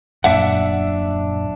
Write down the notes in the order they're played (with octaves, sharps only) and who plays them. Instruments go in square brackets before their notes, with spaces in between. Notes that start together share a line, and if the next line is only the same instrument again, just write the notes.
[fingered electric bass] D#1 F#2 A#2 [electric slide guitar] D4 E5 F#5